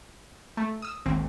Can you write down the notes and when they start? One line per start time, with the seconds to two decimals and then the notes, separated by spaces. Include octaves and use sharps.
0.57 A3
0.82 D#6 E6
1.06 G#1 D#2 C4